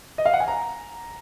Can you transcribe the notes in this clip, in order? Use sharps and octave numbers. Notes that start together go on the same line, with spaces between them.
D#5
F5
F#5
G#5
A#5